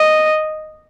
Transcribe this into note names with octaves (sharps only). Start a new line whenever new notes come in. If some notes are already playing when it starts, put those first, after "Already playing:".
Already playing: D#5